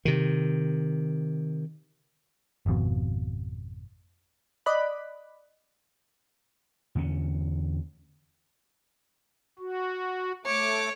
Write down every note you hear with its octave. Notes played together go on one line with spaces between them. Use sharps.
C3 D#3
G#1 F2 B2
D5 D#5 B5 F#6
E2 D3 A3 C#4
F#4
A3 C#5 D6